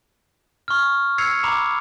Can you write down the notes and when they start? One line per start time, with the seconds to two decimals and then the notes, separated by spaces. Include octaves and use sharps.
0.68 C#6 F6
1.18 E6 G#6 C7 C#7 F7
1.43 A#5 B5 D6 F7